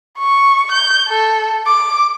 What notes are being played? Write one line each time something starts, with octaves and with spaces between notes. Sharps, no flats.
C#6
G6
A4
D6